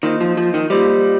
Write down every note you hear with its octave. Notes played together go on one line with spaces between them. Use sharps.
D#3 A#3 F4 C5 D#5
F3
F3
D#3
G3 A#3 F4 C5 D#5